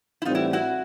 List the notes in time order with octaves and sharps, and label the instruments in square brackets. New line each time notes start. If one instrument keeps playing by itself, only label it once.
[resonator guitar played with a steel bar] E4
[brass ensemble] A2 E3 G3 C4 [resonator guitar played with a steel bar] D#4 F4
[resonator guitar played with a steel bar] E4 F#4
E4 F#4